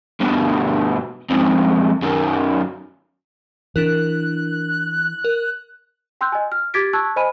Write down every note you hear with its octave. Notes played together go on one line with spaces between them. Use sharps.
G2 B2
F2 G#2
F#2 D#3
E3 D4 E4 A#4 F#6
A#4
G5 C6 E6 F#6 G6
D#5 G#5
F6
G4 D6 G#6 A6 B6 D7
A5 C#6 E6 F#6 G#6
C5 D#5 G#5 B5 D#7